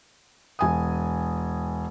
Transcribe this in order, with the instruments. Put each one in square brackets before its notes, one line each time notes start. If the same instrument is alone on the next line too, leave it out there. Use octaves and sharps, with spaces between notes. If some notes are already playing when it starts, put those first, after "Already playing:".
[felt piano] E1 G#5 D#6